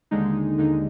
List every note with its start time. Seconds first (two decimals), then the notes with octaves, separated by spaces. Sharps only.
0.11 D#2 D3 G#3 D#4
0.58 D#2 D3 G#3 D#4